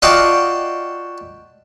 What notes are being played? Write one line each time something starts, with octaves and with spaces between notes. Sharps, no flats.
F4 F#4 D5 D#5 G5 A5